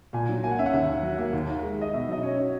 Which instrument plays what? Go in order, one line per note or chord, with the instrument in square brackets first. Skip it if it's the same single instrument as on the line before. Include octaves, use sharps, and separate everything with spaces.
[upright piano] A#2 [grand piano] G#5
[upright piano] F#3
[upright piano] A#3 [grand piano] G#5
[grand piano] F#5
[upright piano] C#4 [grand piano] E5
[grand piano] F#5
[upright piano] D#2 [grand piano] E5
[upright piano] D#3
F#3
A#3
D#2
D#3
G#3
[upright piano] D#4 [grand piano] D#5
[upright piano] B2 [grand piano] E5
[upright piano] F#3 [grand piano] D#5
[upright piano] C#4 [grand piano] C#5
[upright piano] F#4